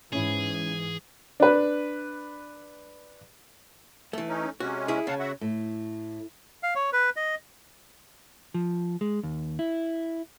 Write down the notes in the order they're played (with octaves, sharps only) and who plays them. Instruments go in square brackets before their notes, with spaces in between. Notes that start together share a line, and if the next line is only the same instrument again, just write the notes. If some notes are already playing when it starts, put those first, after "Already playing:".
[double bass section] G#2 E3 [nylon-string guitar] C#4 E4 [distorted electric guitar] G#4
[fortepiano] D4 B4
[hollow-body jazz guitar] E3 A3
[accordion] C#4 D#4
[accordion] C3 G#3 C#4 [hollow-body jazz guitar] F#4
[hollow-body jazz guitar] E4 G#4
[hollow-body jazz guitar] C#3 [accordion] F5 F#5 A5
[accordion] F#4 E5 F#5
[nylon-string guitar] A2
[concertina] F5
C#5
B4
D#5
[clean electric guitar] F3
G#3
D#2
E4